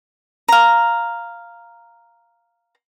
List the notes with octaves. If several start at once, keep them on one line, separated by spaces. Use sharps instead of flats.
F5 A#5